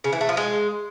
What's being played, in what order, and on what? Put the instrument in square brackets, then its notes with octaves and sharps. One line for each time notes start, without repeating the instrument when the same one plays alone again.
[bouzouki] C#3
E3
A3
F3
G#3